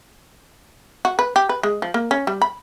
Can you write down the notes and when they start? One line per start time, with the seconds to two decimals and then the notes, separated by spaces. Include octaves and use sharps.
1.05 F#4
1.19 B4
1.36 G4
1.49 B4
1.63 G#3
1.82 F3
1.94 A#3
2.11 C#4
2.27 G3
2.42 B5